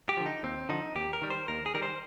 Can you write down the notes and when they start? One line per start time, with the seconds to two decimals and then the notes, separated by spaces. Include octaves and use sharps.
0.09 G4
0.17 D3 F3
0.26 D#4
0.43 D#2 C4
0.69 D3 F3 D#4
0.95 D#2 G4
1.13 A#4
1.22 D#3 G3
1.30 C5
1.48 D#2 A#4
1.66 G#4
1.74 D#3 G3 A#4
1.82 C5